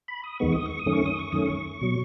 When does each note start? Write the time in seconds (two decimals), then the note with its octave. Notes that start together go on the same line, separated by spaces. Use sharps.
0.08 B5
0.24 D#6
0.40 E2 D#3 G#3 B3 C#6
0.53 D#6
0.66 C#6
0.79 D#6
0.86 F#2 D#3 A3 C#4
0.93 C#6
1.06 D#6
1.19 C#6
1.32 F#2 D#3 A3 C#4 D#6
1.46 C#6
1.81 B2 F#3